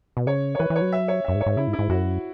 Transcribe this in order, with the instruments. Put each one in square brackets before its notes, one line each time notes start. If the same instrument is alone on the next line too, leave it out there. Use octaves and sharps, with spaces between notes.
[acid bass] B2
[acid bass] C#3 [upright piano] C#5
[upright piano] C#5
[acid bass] E3 [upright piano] B4
[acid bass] E3
[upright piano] C#5
[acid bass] F#3
[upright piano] E5
C#5
[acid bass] F#2 [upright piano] E5
[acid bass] G#2
[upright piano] C#5
[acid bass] G#2
[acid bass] C#3 [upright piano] E4
[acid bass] G#2
[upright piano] E4
[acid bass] G#2
[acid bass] F#2 [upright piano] F#4